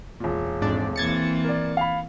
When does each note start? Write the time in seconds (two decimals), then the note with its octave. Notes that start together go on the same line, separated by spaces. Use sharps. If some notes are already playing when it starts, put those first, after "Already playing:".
0.20 E1 A#2
0.62 F2 G#2 D4 D5
0.96 E3 A#3 C4 G#6 A6 C#7
1.44 A#4 D5
1.77 F5 B5